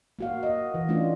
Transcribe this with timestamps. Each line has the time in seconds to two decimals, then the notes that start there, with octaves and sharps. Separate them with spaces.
0.19 A#3 F#4 F5
0.43 D#5
0.74 E3
0.88 A3 C#4 D4 F4